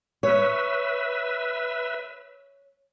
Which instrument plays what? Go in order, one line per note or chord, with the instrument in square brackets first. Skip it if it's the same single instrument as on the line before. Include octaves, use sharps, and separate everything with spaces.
[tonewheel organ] B4 E5 [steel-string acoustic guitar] C#5